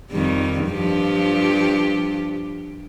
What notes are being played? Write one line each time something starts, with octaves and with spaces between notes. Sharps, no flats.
F2 D#3 G3
G2 F3 G4